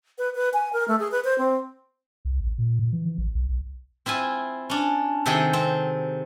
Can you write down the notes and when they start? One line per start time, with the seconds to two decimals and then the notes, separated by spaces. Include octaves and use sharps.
0.18 B4
0.35 B4
0.53 G#5
0.73 A#4
0.88 A3
0.99 G#4
1.11 B4
1.24 C5
1.38 C4
2.25 C2
2.41 A1
2.58 A#2
2.79 A#2
2.92 E3
3.05 E3
3.18 A1
3.35 B1
3.49 B1
4.06 C4 E4 F4 G#5
4.70 C#4 D4
5.26 C3 D#3 G#4 A4 G5
5.53 C4